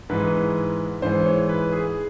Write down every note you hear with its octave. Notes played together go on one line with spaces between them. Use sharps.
G#2 E3 G#3 B4
G#2 E3 G#3 C5
C#5
B4
G#4